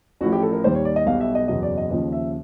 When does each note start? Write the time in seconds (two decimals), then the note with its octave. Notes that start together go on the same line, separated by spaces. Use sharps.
0.21 A1 A2 F3 F#4
0.32 G4
0.43 A4
0.52 A#4
0.64 D#2 D#3 G3 C5
0.75 C#5
0.85 D5
0.96 D#5
1.06 B1 B2 G3 F5
1.20 E5
1.35 D#5
1.48 F#1 E2 B2 F#3 D#5
1.63 D5
1.78 D#5
1.91 D#2 C#3 F3 D#5
2.13 E5